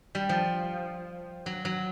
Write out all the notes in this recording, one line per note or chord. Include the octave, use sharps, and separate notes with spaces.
G3
F3
F#3
F#3